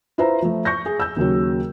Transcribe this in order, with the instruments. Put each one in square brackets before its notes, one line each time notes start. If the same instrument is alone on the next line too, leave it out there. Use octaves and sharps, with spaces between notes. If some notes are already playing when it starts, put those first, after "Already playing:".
[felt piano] E4 F4 B4 C5 E5 A#5
F3 A3
C#6 G6 A#6
G#4
E6 G6
D#2 C#3 F#3